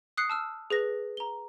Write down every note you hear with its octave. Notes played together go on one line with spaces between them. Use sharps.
D#6 F#6 C7 C#7
A5 E6 F6
G#4 B4 A#6
A#5 G7